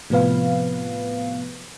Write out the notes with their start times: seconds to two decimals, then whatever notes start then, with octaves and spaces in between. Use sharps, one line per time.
0.10 A2 C3 F3 B3 B4 F5